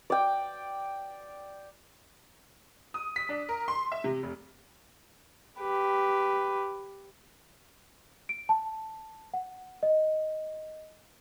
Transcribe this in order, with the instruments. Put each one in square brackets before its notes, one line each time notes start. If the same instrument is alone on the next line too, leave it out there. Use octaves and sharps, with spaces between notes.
[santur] D5 G5
[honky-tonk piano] D#6
B6
D4
A#4
C6
E5
C3
F1
[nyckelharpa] G4 B4
[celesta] D7
A5
F#5
D#5